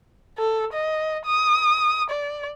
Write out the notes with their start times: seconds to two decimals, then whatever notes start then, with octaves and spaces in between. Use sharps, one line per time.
0.39 A4
0.73 D#5
1.26 D#6
2.10 D5